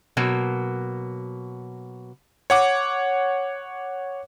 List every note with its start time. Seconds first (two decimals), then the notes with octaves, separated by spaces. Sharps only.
0.17 B2 F#3 A#3
2.50 C#5 F#5 D6